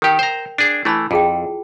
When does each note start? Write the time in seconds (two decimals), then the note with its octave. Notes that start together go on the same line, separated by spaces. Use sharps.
0.02 D#3 G4 A#4 G5
0.19 C5 A#5
0.58 D4 G#4
0.85 E3 A3 E4 A5 B5
1.11 F2 F4 G#4 G5